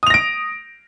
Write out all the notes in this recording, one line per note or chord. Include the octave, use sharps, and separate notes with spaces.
D#6 A#6 D7 F7